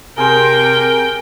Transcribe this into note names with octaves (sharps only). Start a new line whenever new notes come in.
C3 G#4 A#4 C5 G5